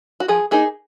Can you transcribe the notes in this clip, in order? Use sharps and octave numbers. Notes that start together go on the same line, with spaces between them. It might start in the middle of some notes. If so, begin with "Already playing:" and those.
F#4
F3 G#4
A#3 D#4 G#4